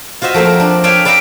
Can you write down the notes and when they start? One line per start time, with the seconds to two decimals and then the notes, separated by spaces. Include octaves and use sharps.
0.22 F4 F#4 C5 D#5 E5
0.34 F3 A3 A#3 C4
0.46 A#4
0.60 D4
0.84 C#5 D5 E5 F5 G5 G#5
1.05 B4 D5 E5 F5 G5 A#5